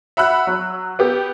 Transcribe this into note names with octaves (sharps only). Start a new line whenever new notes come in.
E5 F#5 B5 E6 F#6
F#3
B3 G4